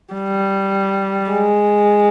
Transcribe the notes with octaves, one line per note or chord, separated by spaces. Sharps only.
G3
G#3